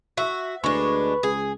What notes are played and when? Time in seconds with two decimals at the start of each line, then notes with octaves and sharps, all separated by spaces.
0.17 F#4 E5
0.64 D2 G#3 D4 B4 C#6
1.23 C#2 G#4